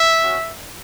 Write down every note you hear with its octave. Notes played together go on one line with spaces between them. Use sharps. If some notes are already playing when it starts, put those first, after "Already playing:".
Already playing: E5
C#4 F#4